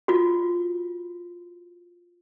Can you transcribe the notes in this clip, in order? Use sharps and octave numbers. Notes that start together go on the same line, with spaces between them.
F4 F#4